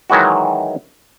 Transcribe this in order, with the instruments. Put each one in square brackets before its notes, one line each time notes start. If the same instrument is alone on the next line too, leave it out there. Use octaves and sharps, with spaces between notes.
[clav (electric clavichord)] D#3 E3 F#3 G#3 E4 F#4